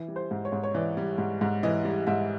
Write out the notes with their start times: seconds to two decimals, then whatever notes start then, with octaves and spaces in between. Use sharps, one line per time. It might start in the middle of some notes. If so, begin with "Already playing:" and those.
Already playing: E3
0.08 G3
0.16 C5
0.31 G#2
0.45 C#5
0.52 G#2
0.64 C#5
0.74 E3 D5
0.97 G3
1.18 G#2
1.41 G#2
1.63 E3 D#5
1.85 G3
2.07 G#2 E5